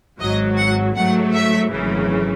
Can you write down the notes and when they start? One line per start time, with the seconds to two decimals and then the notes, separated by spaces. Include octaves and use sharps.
0.20 G#1 G#2 F#3 D#5
0.57 F#5
0.96 G#2 F#3 A3 F#5
1.33 E5
1.72 G#1 F#2 C#3 E3 A3